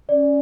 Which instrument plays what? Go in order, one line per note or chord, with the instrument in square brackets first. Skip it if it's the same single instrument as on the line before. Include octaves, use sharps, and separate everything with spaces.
[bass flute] C#4 [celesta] D5